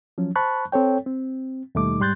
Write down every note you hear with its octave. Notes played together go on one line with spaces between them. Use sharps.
F3 F#3 C#4
C5 A5 B5 C#6 F#6
C4 A4 C#5 G5
C4
D#2 B2 G3 A3 D#4 D6
G#2 G3 C6 F#6 G6 A6